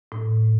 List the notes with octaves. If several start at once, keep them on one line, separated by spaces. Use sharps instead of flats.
A2